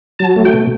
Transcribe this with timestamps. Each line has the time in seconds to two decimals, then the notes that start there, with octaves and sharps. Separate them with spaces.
0.19 F#3 A5
0.36 A3
0.45 G5
0.53 B2